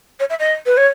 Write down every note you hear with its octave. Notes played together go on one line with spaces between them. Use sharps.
C#5
E5
D#5
B4
C#5